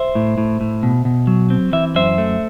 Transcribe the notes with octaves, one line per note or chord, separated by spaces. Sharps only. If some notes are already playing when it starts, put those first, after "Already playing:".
Already playing: C5 E5
A2
A2
A2
B2
B2
F#3
C4
E3 E5
F#2 C5 E5
A3